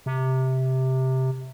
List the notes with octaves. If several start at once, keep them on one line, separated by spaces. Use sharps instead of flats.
C3